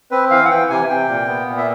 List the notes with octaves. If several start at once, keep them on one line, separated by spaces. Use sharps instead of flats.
C4 B4
E3 F5
F#5
E3 G5
C3 G#5
C3 G5
A#2
B3
A#2
E5